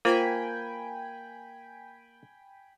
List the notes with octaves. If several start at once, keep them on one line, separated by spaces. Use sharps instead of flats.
A#3 F4 C5 G5 G#5 B5